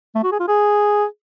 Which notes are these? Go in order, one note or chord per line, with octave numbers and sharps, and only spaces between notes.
A3
F#4
G#4
F4
G#4